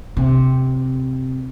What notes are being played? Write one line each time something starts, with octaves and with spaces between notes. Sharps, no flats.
C3